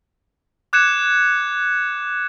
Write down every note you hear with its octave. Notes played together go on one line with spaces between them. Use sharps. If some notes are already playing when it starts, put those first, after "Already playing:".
D6 F#6 G#6 C#7 E7